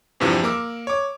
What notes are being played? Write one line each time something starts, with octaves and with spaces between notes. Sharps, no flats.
E2 G2 C3 E3 F3
A#3 A#4 D6 E6
C#5 D6